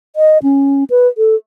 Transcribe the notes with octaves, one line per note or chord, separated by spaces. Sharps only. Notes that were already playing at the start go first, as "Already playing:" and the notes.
D#5
C#4
B4
A4